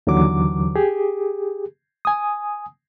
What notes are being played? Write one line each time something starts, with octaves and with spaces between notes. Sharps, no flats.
D#2 D3 E3 F#3 D6
G4 G#4
G#5 D#6